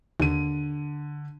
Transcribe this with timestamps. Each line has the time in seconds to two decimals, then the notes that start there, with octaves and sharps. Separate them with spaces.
0.20 D#2 D3 D#7